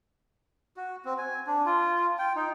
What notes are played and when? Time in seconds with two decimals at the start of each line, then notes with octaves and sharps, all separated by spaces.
0.77 F#4
1.05 C4
1.18 G#5
1.47 D4
1.66 F4
2.19 G5
2.36 D#4